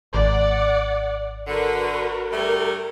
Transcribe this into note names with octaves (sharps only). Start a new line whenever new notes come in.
G#1 D5 F#5
D3 F#4 A#4 B4
G2 G3 A3 A#4